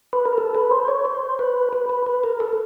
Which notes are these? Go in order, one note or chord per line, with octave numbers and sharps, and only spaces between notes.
B4
A#4
A4
B4
C5
C#5
C5
B4
B4
B4
B4
A#4
A4